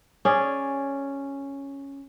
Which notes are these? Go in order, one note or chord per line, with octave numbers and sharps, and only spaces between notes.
C#4 G#4 D5